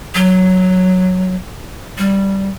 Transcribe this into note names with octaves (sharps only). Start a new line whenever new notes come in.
F#3
G3